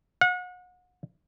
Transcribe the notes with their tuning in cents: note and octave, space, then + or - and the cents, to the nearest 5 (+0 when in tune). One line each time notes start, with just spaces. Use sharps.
F#5 -35